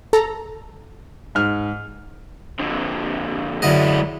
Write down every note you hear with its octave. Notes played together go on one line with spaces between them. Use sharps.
A4 A#5
G#2 F6
F2 D3
F#2 D3 G#3 E4 D#5